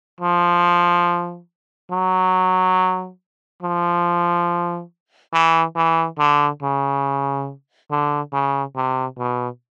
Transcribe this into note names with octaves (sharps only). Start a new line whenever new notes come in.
F3
F#3
F3
E3
E3
D3
C#3
D3
C#3
C3
B2